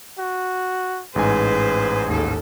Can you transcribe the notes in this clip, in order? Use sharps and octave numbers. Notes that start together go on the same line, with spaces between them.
F#4
A1 G#2 G#4 B4 C5 G#5
D#2 A4